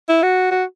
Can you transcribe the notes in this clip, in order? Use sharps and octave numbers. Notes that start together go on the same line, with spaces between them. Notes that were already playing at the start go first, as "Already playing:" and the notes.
E4
F#4
F#4